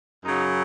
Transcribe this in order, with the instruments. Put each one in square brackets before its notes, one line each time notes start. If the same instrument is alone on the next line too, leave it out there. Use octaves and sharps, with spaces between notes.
[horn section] F#2 C#3 F#3 D#4